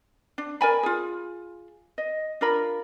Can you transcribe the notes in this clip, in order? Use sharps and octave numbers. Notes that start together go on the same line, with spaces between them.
D4
A#4 D5 G#5 B5
F4 G#4
D#5
D4 F4 A#4 B5